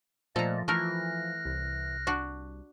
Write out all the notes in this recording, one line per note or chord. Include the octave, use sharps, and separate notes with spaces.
A#2 F3 A3 A4 D5 D#5 A#5
E3 A3 A#4 F6 F#6 A#6
C2
D4 F#4